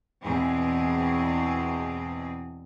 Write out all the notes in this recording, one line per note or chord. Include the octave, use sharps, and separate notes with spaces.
E2 B2 C4 G#4